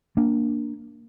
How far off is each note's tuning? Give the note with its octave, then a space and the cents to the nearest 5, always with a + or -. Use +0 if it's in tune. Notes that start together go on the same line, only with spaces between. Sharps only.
A#3 +0 D4 +0